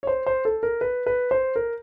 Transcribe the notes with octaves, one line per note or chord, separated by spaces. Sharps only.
C#5
C5
C5
A4
A#4
B4
B4
C5
A#4